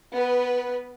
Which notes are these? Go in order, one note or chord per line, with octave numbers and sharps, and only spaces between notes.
B3 B4